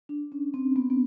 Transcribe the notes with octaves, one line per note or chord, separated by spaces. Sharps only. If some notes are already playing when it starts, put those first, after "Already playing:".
D4
C#4
C4
B3
B3